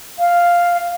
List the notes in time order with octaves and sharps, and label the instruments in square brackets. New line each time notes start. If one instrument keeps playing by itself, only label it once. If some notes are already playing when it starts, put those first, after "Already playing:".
[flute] F5